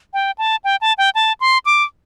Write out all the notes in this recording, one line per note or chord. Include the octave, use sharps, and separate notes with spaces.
G5
A5
G5
A5
G5
A5
C6
D6